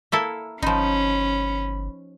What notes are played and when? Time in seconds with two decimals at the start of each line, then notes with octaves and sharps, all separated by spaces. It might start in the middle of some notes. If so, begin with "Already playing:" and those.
0.12 A#3 E4 A4
0.63 G1 F3 C#4 D#4 B5